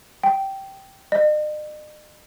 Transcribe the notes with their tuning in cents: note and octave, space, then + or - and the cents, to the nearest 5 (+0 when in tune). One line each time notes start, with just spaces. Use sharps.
G5 -10
D#5 -45